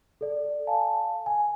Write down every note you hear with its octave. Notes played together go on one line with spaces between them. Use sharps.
A4 D5
F5 G#5 A5
G#5